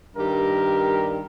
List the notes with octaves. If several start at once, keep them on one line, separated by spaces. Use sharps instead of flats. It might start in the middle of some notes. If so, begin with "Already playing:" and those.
G2 D#3 G3 G4 A#4